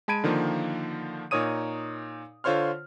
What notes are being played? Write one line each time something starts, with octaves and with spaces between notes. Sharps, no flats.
G#3 A5 B5 G#6 D7 D#7
D3 D#3 F3 A#3
A#2 D#4 A#4 C#5 D#6 D#7
D3 F4 C5 C#5 C6 F6